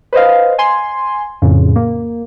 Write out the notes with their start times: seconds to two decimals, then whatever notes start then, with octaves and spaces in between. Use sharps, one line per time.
0.13 B4 C5 D#5 F5
0.59 G#5 C6
1.42 F2 A2 C#3
1.76 A#3